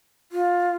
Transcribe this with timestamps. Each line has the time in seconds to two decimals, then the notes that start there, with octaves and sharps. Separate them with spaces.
0.32 F4